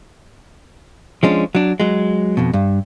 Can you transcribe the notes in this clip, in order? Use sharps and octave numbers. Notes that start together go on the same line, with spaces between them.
F3 G#3 C#4 D4
F#3 D4
F#3 G#3
F2 B2
G2